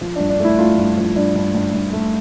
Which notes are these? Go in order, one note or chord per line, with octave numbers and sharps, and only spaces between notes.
F3
D4
G2
D4
A3 E4
A3 F4
G2
F3
G2 D4
G2
G2
G2
A3